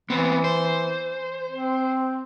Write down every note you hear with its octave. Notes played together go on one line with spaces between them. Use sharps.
E3 B3 C4
C5
C4